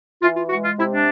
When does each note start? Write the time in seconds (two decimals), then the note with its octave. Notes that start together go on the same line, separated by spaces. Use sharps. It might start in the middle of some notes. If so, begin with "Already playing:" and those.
0.22 E3 F4
0.36 F4
0.49 G#3 F#4
0.64 F4
0.78 C3 E4
0.91 D4